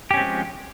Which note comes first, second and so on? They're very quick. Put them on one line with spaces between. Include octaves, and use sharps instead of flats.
G4 C#4 C4 G#3 F3